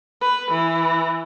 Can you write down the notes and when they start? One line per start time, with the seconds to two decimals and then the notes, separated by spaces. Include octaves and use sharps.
0.22 B4
0.51 E3